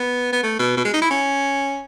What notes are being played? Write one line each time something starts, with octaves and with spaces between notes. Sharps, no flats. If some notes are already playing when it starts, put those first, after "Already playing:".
Already playing: B3
B3
A3
B2
B2
G#3
D#4
E4
C#4